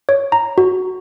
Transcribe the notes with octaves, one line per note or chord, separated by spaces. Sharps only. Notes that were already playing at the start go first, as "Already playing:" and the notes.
C#5
A#5
F#4